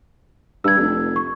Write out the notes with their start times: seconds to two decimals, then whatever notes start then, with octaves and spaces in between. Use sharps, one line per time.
0.64 G2 E6 G#6
0.78 F1
1.16 C#6